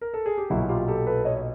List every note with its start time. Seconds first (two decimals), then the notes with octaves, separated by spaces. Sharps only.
0.01 A#4
0.14 A4
0.26 G#4
0.38 G4
0.50 B1 A#2 F#3 E4 F#4
0.69 F4 G4
0.88 G4 A4
1.07 A4 B4
1.25 C#5 D#5
1.36 D#5